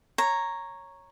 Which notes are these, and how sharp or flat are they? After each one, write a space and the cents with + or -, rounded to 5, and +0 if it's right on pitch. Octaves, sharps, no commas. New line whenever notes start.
C#5 -5 A#5 +0